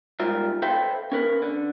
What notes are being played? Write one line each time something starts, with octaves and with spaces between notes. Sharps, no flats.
G#2 G3 F4 A#4 E5
A4 B4 C5 E5 F5 G5
C#4 A#4 B4
D3